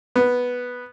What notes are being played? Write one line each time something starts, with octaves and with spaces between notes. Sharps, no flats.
B3